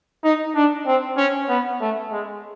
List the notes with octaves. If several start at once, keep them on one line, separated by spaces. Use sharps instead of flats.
D#4
D4
C4
C#4
B3
A3
G#3